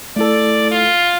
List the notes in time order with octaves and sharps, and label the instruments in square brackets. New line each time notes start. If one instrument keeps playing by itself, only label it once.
[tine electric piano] A3 E4 A4 [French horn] D5
[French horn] F4